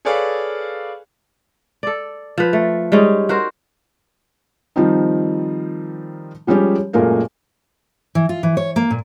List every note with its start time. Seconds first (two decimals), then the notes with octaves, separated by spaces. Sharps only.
0.05 G#4 A4 B4 C#5 D5 F5
1.83 A4 D5
2.38 F3 B4
2.53 A3
2.92 G3 G#3 C#4 D#4
3.29 F#4 A#4 C5
4.76 D#3 F3 G3 C4 D#4
6.47 F3 G3 G#3 C#4 G4
6.93 F#2 A#2 G#3 A3 A#4 F5
8.15 E3
8.29 F4
8.43 E3
8.57 C#5
8.76 A#3
8.91 A#2